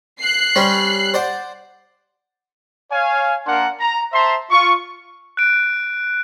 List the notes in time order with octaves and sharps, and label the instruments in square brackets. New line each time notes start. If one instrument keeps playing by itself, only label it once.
[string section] F#6 C7
[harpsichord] G3 C4 C#4
C5 D5 F#5
[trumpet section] C#5 F5 G#5
A#3 D4 A#4 F5 F#5 C6
A#5
C5 E5 A5 A#5 C6
F4 C#6
[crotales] F#6 D7